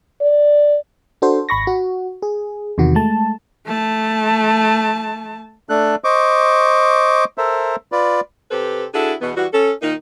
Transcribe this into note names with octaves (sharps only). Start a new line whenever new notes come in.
D5
D4 F#4 A4 C5
G#1 B5 C#6 A#6
F#4
G#4
E2 C3 D#3 F#4
G#3 A3 A5
A3 A5
A3 D4 A4 F#6
C5 D#5 C#6 D6
A4 A#4 C5 E5
F4 B4 D5
C3 G4 A4 B4 C5
D4 E4 F#4 G#4 A4
E2 B2 B3
E3 G3 F#4
C#4 A4
A#2 D#3 D#4